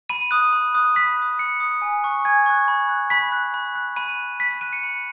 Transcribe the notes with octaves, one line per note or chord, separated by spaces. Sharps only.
B5 D#7
D#6 F#6
B5
D#6 F#6
B5 B6
D#6 F#6
B5 C#7
D#6 F#6
G#5
C#6 F#6
G#5 G#6
C#6 F#6
B5
F#6
B5 B6
F#6
B5
F#6
B5 D#7
F#6
B5 B6
B6
F#6 D#7
C#7
B5